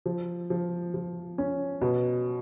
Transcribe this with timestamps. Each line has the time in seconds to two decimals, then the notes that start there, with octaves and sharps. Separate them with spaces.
0.06 F3
0.50 F3
0.94 F3
1.38 C#4
1.81 B2